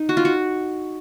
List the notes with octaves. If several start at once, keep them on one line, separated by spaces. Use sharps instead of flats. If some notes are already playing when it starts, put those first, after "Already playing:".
Already playing: D#4
F#4
F4
F#4